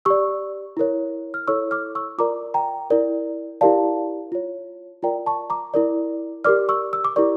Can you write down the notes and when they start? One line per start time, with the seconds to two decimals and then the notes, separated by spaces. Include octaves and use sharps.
0.05 G4 D5 C#6 E6
0.77 E4 A#4 C#5
1.34 F6
1.47 E4 A4 C#5 C#6 E6
1.71 D6 F6
1.95 C#6 E6
2.18 F4 A#4 D5 A#5 D6
2.54 G5 A#5
2.90 E4 A#4 D5
3.61 E4 G4 A#4 D5 F5 A5
4.32 F4 C#5
5.03 F4 A#4 D5 G5 A#5
5.26 A5 C#6
5.50 A#5 D6
5.74 E4 A#4 D5
6.45 G4 A#4 D5 D6 F6
6.69 C#6 E6
6.93 E6
7.05 D6
7.16 E4 G4 A#4 D5 C#6